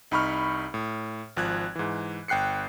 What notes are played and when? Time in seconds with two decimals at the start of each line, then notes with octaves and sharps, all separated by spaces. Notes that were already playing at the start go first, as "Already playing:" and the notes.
0.11 C2 D#4 B5 C#6 F6
0.74 A2
1.37 G#1 F3 F#6 G#6
1.76 G#2 E3
2.28 G1 G5 F#6 C7 C#7